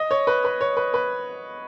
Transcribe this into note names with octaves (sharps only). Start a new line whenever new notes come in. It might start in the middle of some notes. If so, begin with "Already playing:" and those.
Already playing: D#5
C#5
B4
B4
C#5
B4
B4